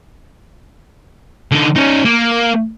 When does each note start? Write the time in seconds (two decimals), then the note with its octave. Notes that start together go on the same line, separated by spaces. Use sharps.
1.52 D3 D#4
1.76 C#4 D#4
2.05 A#3